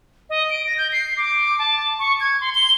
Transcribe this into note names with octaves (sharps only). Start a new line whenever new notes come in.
D#5
D7
A#6
G6
C7
D6
A5
C#6
G#6
C6
G7